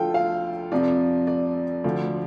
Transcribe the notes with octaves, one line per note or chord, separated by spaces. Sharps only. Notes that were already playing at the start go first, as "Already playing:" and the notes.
Already playing: D2 D3 F3 F4 A4 G5
F5
F2 C3 F3 D5
D5
D2 D3 F3